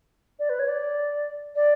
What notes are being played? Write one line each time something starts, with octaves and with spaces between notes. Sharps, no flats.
D5
B4
C#5
D5
D5